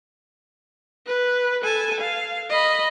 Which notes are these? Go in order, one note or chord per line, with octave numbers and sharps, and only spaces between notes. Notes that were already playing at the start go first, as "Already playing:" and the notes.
B4
A4 G#5
F5
D#5 B5